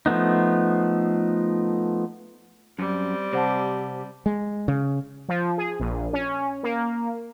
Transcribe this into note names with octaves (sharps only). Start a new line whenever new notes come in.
F3 A3 B3 D#4
F#2 G3 C4
C3 C5 F#5 A5
G#3
C#3
F3
G#4
A#1
C#4
A#3